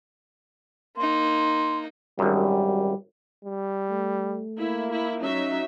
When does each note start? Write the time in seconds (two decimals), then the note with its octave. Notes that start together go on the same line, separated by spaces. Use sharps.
0.97 A#3 D#4 C6
2.19 G#1 F#2 G3
3.45 G3
3.90 A3
4.57 A#3 E4
4.92 E4
5.22 F#3 C#4 D#4 E5